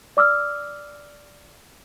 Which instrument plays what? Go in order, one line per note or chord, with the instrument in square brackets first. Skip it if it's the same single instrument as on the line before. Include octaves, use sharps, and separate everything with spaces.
[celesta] D5 D6 E6 F6